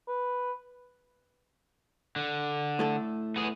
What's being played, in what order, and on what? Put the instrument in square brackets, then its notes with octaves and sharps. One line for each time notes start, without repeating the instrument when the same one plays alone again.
[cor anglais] B4
[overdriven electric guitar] D3
[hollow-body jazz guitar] A2 A3 A4
[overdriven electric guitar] B3 G#4